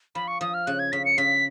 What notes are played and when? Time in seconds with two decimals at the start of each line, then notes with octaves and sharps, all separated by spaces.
0.15 F3 B5
0.28 C#6
0.41 F3 D#6
0.54 F6
0.66 C#3 F#6
0.79 G#6
0.92 C#3 B6
1.05 C#7
1.18 C#3 B6